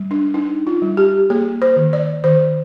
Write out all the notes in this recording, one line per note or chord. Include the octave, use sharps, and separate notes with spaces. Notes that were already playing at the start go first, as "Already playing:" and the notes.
Already playing: G3
D4
D4 D#4
F4
G3
G4
A#3 G#4
C5
D#3
D5
D#3 C5